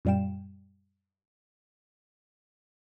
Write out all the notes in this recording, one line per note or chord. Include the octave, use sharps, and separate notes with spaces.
F#2 A#2 G3 F5 G5 E7